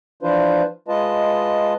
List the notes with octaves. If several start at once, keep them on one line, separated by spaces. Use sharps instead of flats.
E3 F3 D4 F4 B4 C5
G#3 F4 B4 D#5 A5